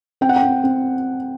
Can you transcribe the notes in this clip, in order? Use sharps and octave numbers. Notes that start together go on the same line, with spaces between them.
C4 G5
F#5
G5
C4
C4